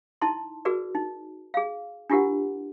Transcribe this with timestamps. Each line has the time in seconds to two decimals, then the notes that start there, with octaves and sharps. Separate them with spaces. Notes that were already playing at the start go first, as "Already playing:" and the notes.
0.22 D#4 E4 A5 C6
0.65 F#4 G#4 A#4 B4 D5
0.95 D#4
1.54 G#4 F5
2.10 D4 E4 F4 G4 A#4 F#5